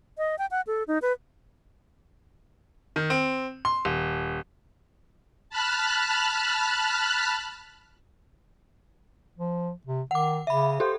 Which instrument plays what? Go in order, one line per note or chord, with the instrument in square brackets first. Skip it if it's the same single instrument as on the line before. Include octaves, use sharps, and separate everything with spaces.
[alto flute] D#5
G5
F#5
A4
D#4
B4
[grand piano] D#3
C4
C6
D#1
[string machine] A5 B5 F6 F#6
[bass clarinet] F3
C3
[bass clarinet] D#3 [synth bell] F#5 D6
[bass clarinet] C#3 [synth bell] E5 B5
[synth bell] G4 A4 [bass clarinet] C5